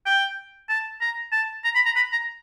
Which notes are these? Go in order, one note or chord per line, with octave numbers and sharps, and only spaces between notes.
G5
A5
A#5
A5
A#5
B5
A#5
B5
A#5